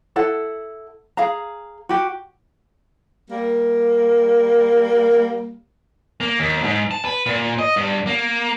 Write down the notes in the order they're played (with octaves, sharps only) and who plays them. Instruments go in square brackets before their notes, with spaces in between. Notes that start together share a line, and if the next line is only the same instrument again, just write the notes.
[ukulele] E4 A4 F#5
G#4 F5 A#5
F#4 G4
[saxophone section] G3 A#3
[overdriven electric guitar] A#3
D#2
G#2
A5
B4
A#2
D#5
G2
A#3